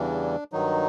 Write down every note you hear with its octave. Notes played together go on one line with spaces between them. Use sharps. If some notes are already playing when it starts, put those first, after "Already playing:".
Already playing: E2 C#3 E3 G3 D4
G2 D#3 F#3 D#4